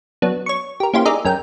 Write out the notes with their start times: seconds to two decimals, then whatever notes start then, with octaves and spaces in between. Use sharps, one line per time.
0.22 F#3 B3 D4
0.46 C#5 C#6
0.80 G4 A#4
0.94 A#3 C#4 E4 F4 G4 C5
1.05 D#4 G#4 A#4 D5 E5
1.25 F#2 C#4 A#4 G5